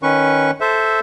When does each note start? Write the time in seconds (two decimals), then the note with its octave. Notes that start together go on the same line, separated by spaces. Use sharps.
0.03 D#3 C#4 B4 C#6
0.61 A4 C5 E5